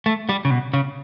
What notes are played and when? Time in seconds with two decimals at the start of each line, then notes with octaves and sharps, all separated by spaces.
0.06 A3
0.29 G3
0.45 C#3
0.51 B2
0.73 C#3